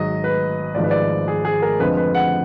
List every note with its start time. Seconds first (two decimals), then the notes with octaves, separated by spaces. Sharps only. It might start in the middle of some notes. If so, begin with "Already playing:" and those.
Already playing: G#1 G#2 F#3 D#5
0.24 B4
0.75 G#1 G#2 F3 D5
0.84 B4
0.91 D5
1.28 G#4
1.45 G#4
1.62 A#4
1.79 F2 D3 F3 G#3 B4
1.97 B4
2.15 F#5